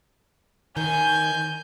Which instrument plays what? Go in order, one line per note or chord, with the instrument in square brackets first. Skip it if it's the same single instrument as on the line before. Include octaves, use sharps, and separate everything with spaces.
[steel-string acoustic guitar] D#3 [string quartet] G#5 G6